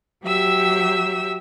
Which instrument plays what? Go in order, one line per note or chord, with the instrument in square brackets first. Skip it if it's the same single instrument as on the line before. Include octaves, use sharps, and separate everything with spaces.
[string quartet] F#3 G4 E5 E6